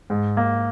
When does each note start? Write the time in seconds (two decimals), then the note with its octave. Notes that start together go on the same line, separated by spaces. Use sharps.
0.10 G#2
0.37 A#3